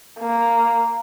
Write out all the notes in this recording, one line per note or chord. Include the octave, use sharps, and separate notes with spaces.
A#3